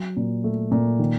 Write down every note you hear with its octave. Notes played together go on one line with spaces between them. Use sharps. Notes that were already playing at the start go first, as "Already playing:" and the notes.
Already playing: F#3
A#2
A3
A#2
D#3